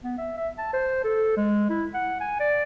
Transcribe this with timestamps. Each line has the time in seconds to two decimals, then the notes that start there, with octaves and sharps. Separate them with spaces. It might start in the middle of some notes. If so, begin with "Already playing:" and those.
0.03 B3
0.18 E5
0.37 E5
0.58 A5
0.73 C5
1.04 A4
1.37 G#3
1.70 E4
1.94 F#5
2.21 G#5
2.40 D5